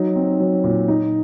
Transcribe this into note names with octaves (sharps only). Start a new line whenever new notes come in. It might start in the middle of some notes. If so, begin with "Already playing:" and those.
Already playing: F#3 D#4
C4
F#3
A#2
D#4